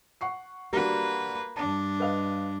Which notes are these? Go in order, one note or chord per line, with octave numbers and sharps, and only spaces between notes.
F#5 C#6 C7
G3 A#3 D4 F#4 B4
G2 D4 A5
B4 D#5 F5